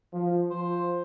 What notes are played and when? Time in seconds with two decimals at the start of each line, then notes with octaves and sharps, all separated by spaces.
0.13 F3
0.51 F3 C5